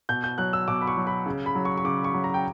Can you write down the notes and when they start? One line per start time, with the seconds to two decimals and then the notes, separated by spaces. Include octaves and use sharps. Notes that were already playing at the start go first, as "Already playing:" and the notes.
0.09 B2 G6
0.24 G6
0.38 F#3 F#6
0.53 E6
0.68 B2 D6
0.82 B5
0.87 C#6
0.97 F#3
1.07 B5
1.26 C#3
1.46 B5
1.55 F#3
1.65 C#6
1.77 C#6
1.84 C#3 D6
2.04 C#6
2.14 F#3
2.24 A#5
2.34 G5